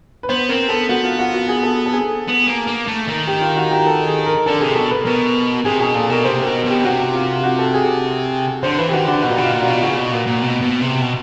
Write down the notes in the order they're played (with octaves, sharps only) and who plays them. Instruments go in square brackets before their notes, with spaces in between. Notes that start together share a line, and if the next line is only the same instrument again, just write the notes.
[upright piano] B4
[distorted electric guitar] B3 [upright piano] C5
[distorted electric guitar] C4 [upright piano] A#4
[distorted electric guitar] B3 [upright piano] A4
[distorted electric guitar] B3 [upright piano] F#4
[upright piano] F4
F#4
F#4
G#4
A4
A4
G#4
[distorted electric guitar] B3
A#3
A#3
A3
D#3
[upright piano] G4
F4
F#4
G4
A4
G#4
A#4
[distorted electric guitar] D3 [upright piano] A4
[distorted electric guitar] C3 [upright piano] G#4
[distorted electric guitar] B2 [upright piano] A4
[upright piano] B4
[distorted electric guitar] B2 [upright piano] A#4
[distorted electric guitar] C3 [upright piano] G#4
[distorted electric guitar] B2 [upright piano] G#4
[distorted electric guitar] A#2 [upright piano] A4
[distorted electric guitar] B2 [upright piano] A#4
[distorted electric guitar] C3 [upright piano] C5
[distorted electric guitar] B2 [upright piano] A#4
[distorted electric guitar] B2
[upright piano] G4
[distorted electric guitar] C3 [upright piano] F#4
[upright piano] F4
F#4
A4
G#4
[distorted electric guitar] D3 [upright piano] C5
[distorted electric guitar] E3 [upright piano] B4
[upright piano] G4
[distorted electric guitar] D#3 [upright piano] F#4
[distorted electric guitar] D3 [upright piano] F#4
[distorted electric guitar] B2 [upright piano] F#4
[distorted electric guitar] A#2
[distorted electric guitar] B2 [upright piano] F4
[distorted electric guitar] A#2
[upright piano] F#4
[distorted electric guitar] B2
[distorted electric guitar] C#3 [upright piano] F#4
[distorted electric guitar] B2
A#2
A#2
B2
B2
C3
B2